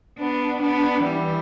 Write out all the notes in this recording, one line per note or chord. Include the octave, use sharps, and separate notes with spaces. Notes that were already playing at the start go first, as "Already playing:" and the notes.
B3 D4
B3 D4
E3 G3